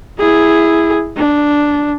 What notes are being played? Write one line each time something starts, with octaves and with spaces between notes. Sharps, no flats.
E4 G#4
D4